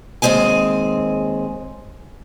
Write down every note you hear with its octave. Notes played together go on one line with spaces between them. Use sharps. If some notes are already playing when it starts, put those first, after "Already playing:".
D#2 G#3 C4 G#4 G#5